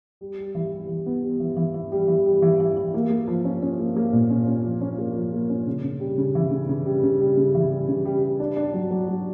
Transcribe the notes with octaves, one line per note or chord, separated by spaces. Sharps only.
G3
G3
E3
G3
E3
B3
G3
E3
E3
E3
G3
E3
G3
E3
E3
E3
A#3
A#3
F3
C#4
C#4
A#3
A#3
A#2
C#4
C#4
F3
C#4
A#3
F3
A#3
C#4
C#3
C#3
G3
C#3
E3
C#3
C#3
G3
C#3
G3
C#3
E3
G3
C#3
G3
G3
D4
D4
F#3
F#3
F#3